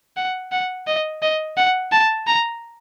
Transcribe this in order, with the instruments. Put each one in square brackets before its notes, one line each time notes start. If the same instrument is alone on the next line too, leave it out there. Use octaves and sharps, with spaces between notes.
[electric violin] F#5
F#5
D#5
D#5
F#5
A5
A#5